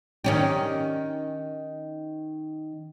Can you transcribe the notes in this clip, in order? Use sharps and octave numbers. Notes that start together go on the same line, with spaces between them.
D#3 C#4 G4